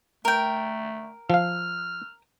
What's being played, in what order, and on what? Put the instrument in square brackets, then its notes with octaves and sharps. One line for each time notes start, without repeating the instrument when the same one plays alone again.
[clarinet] A3 [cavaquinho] A#4 G5
[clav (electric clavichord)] F3 F5 [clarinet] F6